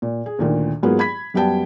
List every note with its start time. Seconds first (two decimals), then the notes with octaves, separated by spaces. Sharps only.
0.02 A#2
0.26 G#4
0.39 D2 A#2 D#3
0.83 G#2 F#3 A#3 B3 F4 G#4
0.99 B5 G#6 B6
1.34 F#2 G3 B3 G5 A5